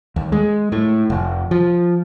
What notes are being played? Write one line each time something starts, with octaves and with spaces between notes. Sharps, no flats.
D#2
G#3
A2
F1
F3